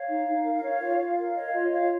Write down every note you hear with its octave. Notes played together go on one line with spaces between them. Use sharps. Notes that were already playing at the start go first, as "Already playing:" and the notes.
Already playing: C#5 F5
D#4
D#4
A#4
C#5
F4
F4
A#4
C#5 D#5
F5
F4 D#5
F4 C#5 F5